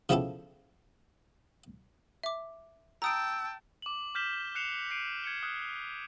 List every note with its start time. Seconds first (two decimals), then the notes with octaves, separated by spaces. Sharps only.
0.09 C#3 F3 B3 E4 G4 A4
2.23 E5 D6
3.02 G5 A5 A#5 D#6 E6 D7
3.82 D6 F#7
4.15 D6 F6 G6 B6 E7 G7
4.55 F#6 C7 C#7 E7 F7
4.90 B6 C7 D7 D#7 F7
5.24 G#6 C#7 G7
5.43 D#6 F6 F#6